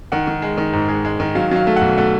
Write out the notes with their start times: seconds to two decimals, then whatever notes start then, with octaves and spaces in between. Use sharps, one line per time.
0.12 D#3 F#5
0.27 D#3
0.42 G#3
0.57 D#3
0.73 G#2
0.89 G#3
1.05 G#3
1.20 D#3
1.35 F#3 F5
1.51 F#3 F5
1.67 A3
1.76 B1 F#5
1.97 A3 F#5